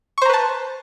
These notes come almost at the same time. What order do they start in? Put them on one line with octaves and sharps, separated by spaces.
C#6 C5 A#5 B4 A5